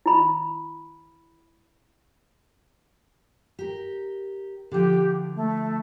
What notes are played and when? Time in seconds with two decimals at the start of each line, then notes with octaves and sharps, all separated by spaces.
0.06 E4 B5
3.59 G4 A#4
4.71 D3 F3 G4
5.36 A3